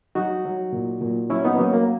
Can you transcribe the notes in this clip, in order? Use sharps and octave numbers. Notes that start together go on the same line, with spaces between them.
F#3 D#4 F#4
F#3
A#2
A#2
F#3 C#4 E4
B3 D#4
F#3 A#3 C#4
A#3